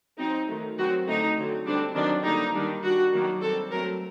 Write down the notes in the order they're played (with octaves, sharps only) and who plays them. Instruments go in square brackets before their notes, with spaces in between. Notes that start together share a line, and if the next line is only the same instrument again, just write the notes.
[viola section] F#3 C4 D#4
D#3 F#3 A3
D#3 F#3 C4 F#4
D3 A3 C4 D#4
D3 F#3 C4
D3 G3 C4 D4
D#3 F#3 C4 D4
D3 G3 A#3 D4 D#4
D#3 G3 D4
G3 D4 F#4
D#3 F#3 A#3 D4
G3 C4 A4
F#3 A3 C4 A#4